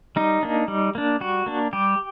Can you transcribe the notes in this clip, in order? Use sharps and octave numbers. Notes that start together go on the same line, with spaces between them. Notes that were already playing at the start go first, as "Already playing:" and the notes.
G3 D#4
A#3 D4
G3
A#3 D4
G3 F#4
A#3 D4
G3 G4